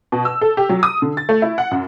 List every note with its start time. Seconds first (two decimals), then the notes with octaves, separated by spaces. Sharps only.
0.12 B2
0.25 E6
0.41 A4
0.57 G4
0.69 F#3
0.83 D#6
1.02 D3
1.17 A6
1.29 A3
1.42 E4
1.58 F#5
1.71 F#2